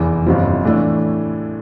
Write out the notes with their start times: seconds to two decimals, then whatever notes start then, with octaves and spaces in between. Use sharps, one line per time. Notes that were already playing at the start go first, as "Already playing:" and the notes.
Already playing: F1 E2 E3
0.26 G1 F2 C3 F3
0.65 A2 E3 A3 D4